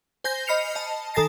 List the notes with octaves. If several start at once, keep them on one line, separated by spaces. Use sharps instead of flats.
C5 G#5 G6 A#6
D#5 B5 F6 C7 C#7 F7
D#5 A5
D#3 A4 G#5 A6 A#6 C7